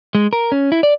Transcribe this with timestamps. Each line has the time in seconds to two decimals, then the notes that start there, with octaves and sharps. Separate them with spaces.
0.15 G#3
0.33 A#4
0.52 C#4
0.72 E4
0.83 D5